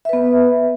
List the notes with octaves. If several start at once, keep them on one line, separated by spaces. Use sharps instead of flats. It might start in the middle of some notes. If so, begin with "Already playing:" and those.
B3 B4 E5